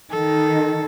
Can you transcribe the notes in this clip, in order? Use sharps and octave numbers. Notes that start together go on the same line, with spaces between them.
D#3 A4